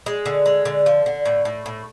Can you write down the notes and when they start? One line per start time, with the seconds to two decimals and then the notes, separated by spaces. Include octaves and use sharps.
0.06 G#3
0.26 D3
0.46 G#3
0.65 D3
0.86 F3
1.06 D3
1.26 A2
1.45 A2
1.66 A2